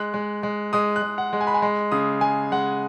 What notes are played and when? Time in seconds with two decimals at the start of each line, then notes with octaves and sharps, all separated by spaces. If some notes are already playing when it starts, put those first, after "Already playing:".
Already playing: G#3 F#6
0.14 G#3
0.43 G#3
0.73 G#3 D#6
0.96 F#6
1.02 G#3
1.18 F#5
1.33 G#3
1.41 G#5
1.47 B5
1.54 G#5
1.62 G#3
1.92 C#3 D#6
2.21 G#3 G#5
2.52 G#3 F#5